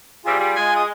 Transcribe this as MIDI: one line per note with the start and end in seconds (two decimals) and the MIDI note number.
0.25 0.37 48
0.25 0.37 55
0.25 0.82 65
0.25 0.82 68
0.38 0.55 55
0.56 0.92 56
0.56 0.76 80
0.76 0.86 87